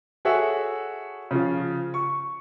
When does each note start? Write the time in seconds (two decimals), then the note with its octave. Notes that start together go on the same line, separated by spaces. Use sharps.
0.25 F#4 G#4 A4 C#5 E5 F#5
1.31 C#3 F3 F4
1.94 C#6